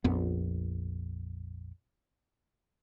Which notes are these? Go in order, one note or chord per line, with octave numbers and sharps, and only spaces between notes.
A#1 F2 B3